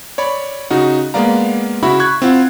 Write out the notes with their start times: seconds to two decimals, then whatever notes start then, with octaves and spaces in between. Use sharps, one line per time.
0.18 C#5 D5 B5
0.71 C#3 D#4 F#4
1.14 G#3 A#3 B3 D5 F5 A#5
1.83 C#3 E4 F#4 E5 B5
1.99 B5 C#6 F#6 G#6
2.22 C4 E4 F4 F#5